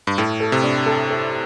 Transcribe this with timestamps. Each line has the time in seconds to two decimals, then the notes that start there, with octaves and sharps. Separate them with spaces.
0.07 G2
0.18 A2 A4
0.40 A4
0.52 C3
0.63 D4
0.86 A4
1.10 A4